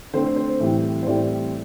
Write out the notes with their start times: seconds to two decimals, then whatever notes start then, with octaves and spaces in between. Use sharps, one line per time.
0.13 D3 A3 C4 C5
0.36 C5
0.60 A2 E3 G3 C4
1.03 C5
1.07 A2 E3 G3 C4 D5